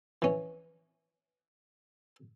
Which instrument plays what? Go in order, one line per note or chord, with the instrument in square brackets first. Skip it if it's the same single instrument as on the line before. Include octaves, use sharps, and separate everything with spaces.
[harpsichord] E3 C#4